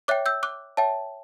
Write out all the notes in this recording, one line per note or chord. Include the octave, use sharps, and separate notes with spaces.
C#5 E5 G5 D6 F#6
E6 G6
D6 F#6
C#5 E5 G5 A5